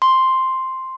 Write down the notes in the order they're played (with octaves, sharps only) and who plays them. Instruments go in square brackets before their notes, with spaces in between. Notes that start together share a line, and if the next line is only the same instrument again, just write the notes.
[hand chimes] C6